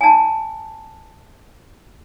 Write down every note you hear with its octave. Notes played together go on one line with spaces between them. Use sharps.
G#5 A5